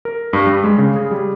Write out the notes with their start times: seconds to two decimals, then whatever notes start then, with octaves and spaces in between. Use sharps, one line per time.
0.05 A#4
0.33 G2
0.46 G3
0.64 G#3
0.78 C#3
0.96 G#4
1.11 G3